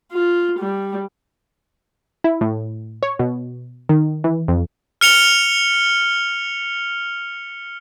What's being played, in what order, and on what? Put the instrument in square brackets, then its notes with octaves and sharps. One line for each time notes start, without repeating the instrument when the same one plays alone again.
[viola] F4
G3
[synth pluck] E4
A2
C#5
B2
D#3
E3
F2
[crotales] F6 C#7 F7 G7